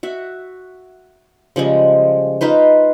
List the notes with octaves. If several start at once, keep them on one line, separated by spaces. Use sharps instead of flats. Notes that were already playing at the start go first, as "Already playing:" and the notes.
F#4 E5
C#3 F3 G3 G#3
D#4 F4 B4 C5